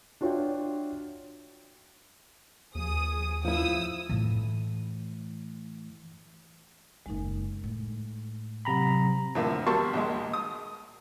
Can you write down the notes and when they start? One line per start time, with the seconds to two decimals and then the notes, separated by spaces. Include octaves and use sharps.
0.21 D4 F4 F#4 C#5 E5 G5
2.75 D#2 F3 G#4 D#6
3.45 F3 E4 D#6 E6
4.09 A2 E3
7.06 F#1 D#2 G#3 D#4
7.64 A2
8.65 C3 F#3 G5 A#5 B5
9.35 F2 A2 D3 A3 A#3
9.67 F#3 G3 A#3 A5 C6 C#6
9.93 A#1 D#2 G#3
10.34 D#6